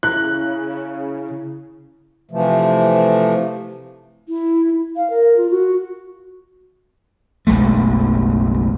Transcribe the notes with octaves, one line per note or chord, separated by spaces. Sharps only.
C#3 E4 F#6
C3 E3 F3 A3
E4
F5
A#4
F4
F#4
F#1 B1 G#3 A3